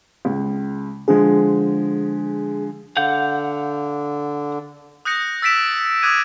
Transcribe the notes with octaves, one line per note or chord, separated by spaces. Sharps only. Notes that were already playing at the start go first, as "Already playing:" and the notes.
C#2
D3 F3 G#3 G#4
D3 F5 F#5 G6
D#6 F#6 G6 A#6 C#7
E6 A6 B6 D7 E7
D6 D#6 F#6 G#6 D#7